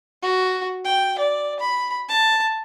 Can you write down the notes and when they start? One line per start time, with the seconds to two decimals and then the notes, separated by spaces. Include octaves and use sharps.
0.22 F#4
0.85 G5
1.18 D5
1.60 B5
2.09 A5